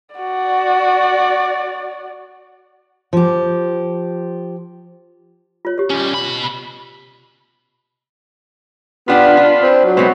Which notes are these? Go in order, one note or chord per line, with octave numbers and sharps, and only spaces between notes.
F#4 D5
F3 G4
F4 C#5
G4 C#5
G3 C#4
B2 B5
B3 D4 F4 G4 B5
D4
C4
F#3
B2 G#3 B3 C4 B4